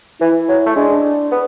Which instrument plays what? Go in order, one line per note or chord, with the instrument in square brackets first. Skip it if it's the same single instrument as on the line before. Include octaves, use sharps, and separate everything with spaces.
[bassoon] E3 [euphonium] E4
[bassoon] F#3
A3
[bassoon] G#3 [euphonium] D4
[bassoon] B3